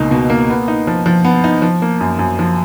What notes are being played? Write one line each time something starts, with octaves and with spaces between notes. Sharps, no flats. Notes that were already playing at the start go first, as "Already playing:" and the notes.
Already playing: C#2 B2 A#3 D#4
B2
A#3
B3
D#4
F3
F3
B3
D#4
F3
A#3
F#2
F#2
F3